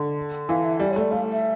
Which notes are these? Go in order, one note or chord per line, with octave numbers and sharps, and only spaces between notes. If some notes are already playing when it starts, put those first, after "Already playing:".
Already playing: D3
E3 F5
E5
G3 D5
C#5
A3
D5
A3 F5
E5